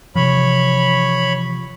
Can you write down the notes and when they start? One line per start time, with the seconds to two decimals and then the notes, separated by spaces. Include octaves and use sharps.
0.16 C3 E3 F3 C#5 B5